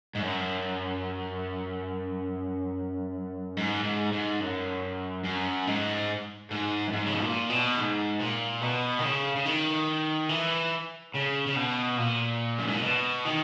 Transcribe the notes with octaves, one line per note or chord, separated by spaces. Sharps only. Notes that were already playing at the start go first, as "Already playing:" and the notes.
G#2
F#2
G#2
G#2
G#2
F#2
F#2
G#2
G#2
F#2
G#2
C#3
B2
A#2
B2
G#2
A#2
B2
D#3
C#3
C#3
D#3
E3
C#3
C#3
B2
A#2
F#2
G#2
A#2
B2
D#3